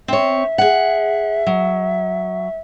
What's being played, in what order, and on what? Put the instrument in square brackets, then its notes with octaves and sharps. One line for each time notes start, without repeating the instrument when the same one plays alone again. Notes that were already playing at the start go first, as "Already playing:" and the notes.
[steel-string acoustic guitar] C4 C#5 [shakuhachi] E5
[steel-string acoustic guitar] G#4 F#5
F#3